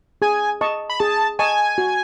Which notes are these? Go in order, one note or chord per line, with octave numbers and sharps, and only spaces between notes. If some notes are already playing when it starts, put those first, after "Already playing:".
G#4 G#5
D#5 A5 C#6
B5
G#4 A5
D#5 G#5 A5 C#6
F#4